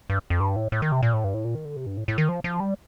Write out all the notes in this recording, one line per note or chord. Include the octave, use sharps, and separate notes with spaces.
G2
F2
G2
A2
A2
D#3
C3
A#2
A2
G2
A2
A#2
D#3
D3
C3
G2
A2
A2
D#3
F3
F3
G3